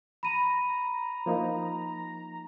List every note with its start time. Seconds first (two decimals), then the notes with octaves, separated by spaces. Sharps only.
0.23 A#5 B5 D#7
1.26 F3 A#3 D#4